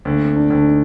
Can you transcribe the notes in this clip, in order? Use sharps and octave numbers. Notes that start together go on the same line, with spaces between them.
D2 A#3
C4
D4
D2
D4
D#4